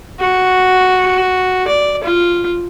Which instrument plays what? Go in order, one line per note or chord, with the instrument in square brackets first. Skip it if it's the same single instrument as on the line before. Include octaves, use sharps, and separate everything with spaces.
[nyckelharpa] F#4
D5
F4